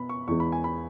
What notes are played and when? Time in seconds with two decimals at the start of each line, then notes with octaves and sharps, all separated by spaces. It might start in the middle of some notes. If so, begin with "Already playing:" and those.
Already playing: B2 B3 B5
0.09 C#6
0.27 E2 E3 G#3 B3 C#6
0.40 B5
0.52 G#5
0.64 B5